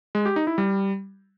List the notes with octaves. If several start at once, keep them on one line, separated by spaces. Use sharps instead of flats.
G#3
G4
D#4
E4
G3